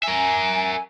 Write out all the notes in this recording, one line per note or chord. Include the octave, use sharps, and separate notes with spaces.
A#4 E5 G#5